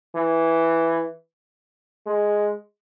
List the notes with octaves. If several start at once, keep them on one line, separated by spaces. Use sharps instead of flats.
E3
G#3